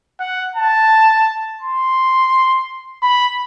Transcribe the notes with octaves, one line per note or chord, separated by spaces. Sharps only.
F#5
A5
C6
B5